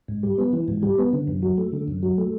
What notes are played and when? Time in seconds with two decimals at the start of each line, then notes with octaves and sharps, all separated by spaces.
0.08 G#2
0.23 G3
0.38 B3
0.53 E3
0.68 G#2
0.83 G3
0.98 B3
1.13 D3
1.27 F#2
1.43 F#3
1.58 A3
1.72 D3
1.88 F#2
2.03 F#3
2.18 A3